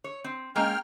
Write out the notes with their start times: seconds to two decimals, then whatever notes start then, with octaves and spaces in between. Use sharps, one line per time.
0.04 C#5
0.24 C4
0.56 G#3 A#3 C#4 G5 F6